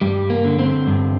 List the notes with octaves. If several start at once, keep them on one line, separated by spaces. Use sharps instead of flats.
G2 G3
A#3
D3
C4
G2